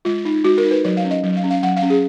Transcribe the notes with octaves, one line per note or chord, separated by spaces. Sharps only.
G#3 F4
D#4
G#3 F#4
A#4
D#4
B4
F#3 C#5
F5
C#4
D#5
F#3
F5
C#4
F5
F#3 F#5
F5
C#4
G#4